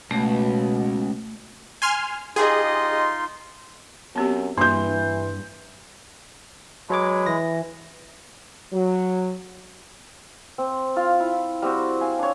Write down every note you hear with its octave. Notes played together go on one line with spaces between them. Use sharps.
C#2 B2 A3
G#5 C6 F6
D#4 F4 G4 G#4 D#5 C6
F#2 B3 C4 G4
G2 E3 A#3 F#4 B4 C6 G6
F#3 G#3 B4 C#5 D6
E3 A#6
F#3
C4
F4 F5
E4
G3 C4 F#4
F5 G#5
D4 C#5